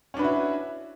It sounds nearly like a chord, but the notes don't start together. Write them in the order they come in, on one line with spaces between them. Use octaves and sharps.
C#4 D4 B4 F#4 E4